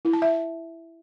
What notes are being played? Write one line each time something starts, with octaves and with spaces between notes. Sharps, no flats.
E4
A5
E5